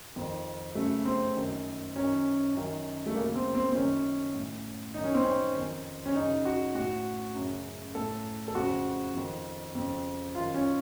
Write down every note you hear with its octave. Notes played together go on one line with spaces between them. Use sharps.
F2 D#3
F#2 C#3 A3
C4
F#2 D#3
F#2 D#3 C#4
F#2 D#3
A3
F#2 C#3 A#3
C4
C4
C4
F#2 D#3 C#4
A2
F#2 D#3 D#4
C#4
C4
C#4
F2 D#3
C#4
F#2 C#3 D#4
F#4
A2 F#4
F#2 C#3
A2 A4
A4
F2 C#3 F#4
F2 D#3
F2 C#3
F#2 D#3 F4
C#4